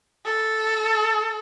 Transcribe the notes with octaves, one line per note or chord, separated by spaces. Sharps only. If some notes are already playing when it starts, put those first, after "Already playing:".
A4